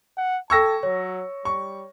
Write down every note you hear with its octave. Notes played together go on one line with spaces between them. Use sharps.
F#5
A4 G5 A5 C#6 E6 G#6 A#6
F#3 C#5
G3 C#6